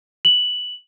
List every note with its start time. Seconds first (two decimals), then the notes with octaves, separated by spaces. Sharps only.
0.25 F#7